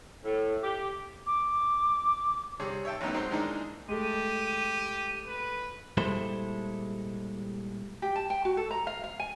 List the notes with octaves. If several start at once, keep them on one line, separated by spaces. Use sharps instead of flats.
A2
G4
D6
C3 G3 G#4 C#5
C#5 E5 G5 A5
A1 F#2 A2 B3 D#4
F#3 G#3 C4 D#4
D#3 E3 G#3 A#3 D4 D#4
G#3 A3 G4 D#7
B4
A#2 G3 G#3 E4 A4 C5
G4
A5
G5
F#4
A4
A#5
F5
F5
G#5